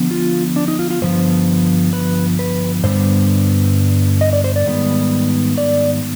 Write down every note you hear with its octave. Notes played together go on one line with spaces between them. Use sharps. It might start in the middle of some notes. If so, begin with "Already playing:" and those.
Already playing: D3 F3 B3
F4
D4
D#4
F4
F4
G2 D3 F3 B3 C5
B4
B4
G2 D3 G3 B3 C5
D#5
D5
C5
D5
G#2 D#3 G3 B3
D5